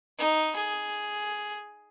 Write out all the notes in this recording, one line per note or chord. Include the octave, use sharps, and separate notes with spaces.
D#4
G#4